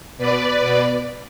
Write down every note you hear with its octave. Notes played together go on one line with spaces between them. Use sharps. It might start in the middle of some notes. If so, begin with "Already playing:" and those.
B2 B4 D5
B2